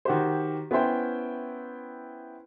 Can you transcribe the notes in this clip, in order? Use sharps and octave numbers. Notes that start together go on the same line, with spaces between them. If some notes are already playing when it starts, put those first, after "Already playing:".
D#3 F#4 G4 C5
B3 C#4 E4 C5 G5